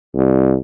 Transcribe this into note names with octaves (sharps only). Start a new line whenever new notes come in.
C2